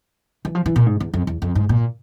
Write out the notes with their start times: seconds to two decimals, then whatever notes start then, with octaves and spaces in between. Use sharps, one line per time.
0.45 E3
0.55 F3
0.66 E3
0.76 A#2
0.86 G#2
1.00 E2
1.14 F2
1.27 E2
1.42 F2
1.55 G#2
1.69 A#2